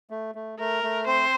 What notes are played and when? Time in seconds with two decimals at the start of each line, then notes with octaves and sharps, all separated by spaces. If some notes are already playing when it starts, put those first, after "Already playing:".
0.10 A3
0.35 A3
0.59 A3 A#4
0.84 A3
1.07 C4 C5